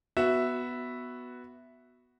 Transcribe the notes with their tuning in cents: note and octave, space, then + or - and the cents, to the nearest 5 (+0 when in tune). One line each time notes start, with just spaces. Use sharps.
B3 +0 F#4 +0 E5 +0